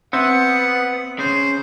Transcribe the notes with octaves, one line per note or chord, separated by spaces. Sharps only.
B3 C4 E5 F#5
C#3 C5